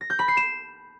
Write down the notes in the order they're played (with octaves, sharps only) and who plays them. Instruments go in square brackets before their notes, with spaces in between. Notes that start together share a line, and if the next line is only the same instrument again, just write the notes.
[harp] A#6
G6
B5
C7
E7